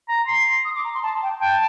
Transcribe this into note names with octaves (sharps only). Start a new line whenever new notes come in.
A#5
C6
D#6
D6
A#5
C6
A5
G5
G5 A5